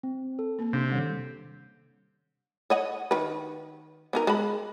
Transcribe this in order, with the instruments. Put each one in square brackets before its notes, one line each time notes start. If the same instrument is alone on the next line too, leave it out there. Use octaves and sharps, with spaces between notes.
[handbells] C4
A4
[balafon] A#3
[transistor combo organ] C3 [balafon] C#4 D4
[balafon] D#3 G3
[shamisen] C#5 D#5 F#5
D#3 B4
B3 D#4 A#4
G#3 A5 B5